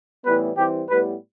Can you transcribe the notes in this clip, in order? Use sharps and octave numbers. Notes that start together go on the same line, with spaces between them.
A2 E3 G3 B3 B4
E3 G3 C4 G4
A2 G3 B3 B4